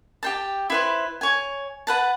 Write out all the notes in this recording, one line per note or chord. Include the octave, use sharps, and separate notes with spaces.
G4 G5 A5
E4 B4 C5
C#5 G#5
B4 F#5 A5